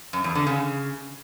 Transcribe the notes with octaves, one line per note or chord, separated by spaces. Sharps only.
F#2
E2
D3
C#3